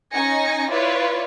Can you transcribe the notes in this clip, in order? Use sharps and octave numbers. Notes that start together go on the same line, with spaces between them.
C#4 D#4 G#5 A#6 C#7
E4 F4 B4 C#5 D5